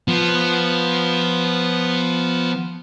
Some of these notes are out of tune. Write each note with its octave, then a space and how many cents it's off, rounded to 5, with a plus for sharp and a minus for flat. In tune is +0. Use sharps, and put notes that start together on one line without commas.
F3 +0 B3 +0